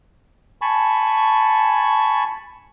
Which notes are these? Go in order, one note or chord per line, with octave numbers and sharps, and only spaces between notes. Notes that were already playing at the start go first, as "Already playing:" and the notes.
G#5 A5 B5 C#6